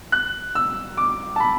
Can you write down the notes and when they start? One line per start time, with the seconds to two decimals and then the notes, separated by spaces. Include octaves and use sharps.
0.12 F#6
0.55 E6
0.97 D6
1.36 A5
1.40 B5